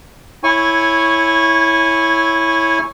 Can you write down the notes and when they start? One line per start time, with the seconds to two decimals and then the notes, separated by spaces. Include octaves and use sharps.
0.43 E4 C#5 G#5 C#6